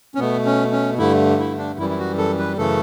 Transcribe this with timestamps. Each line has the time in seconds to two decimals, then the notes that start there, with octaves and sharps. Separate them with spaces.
0.15 C#4
0.19 B2 A3 B3
0.45 C#4
0.72 C#4
0.98 G2 D3 A3 E4
1.39 E4
1.58 D4
1.78 F#2 E3 G3 E4
1.90 E4
1.98 F#4
2.18 A4
2.38 B4
2.57 F#2 C#3 E3 A3 A4